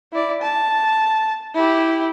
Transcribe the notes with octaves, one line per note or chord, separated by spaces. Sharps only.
E4 D5
A5
E4 G4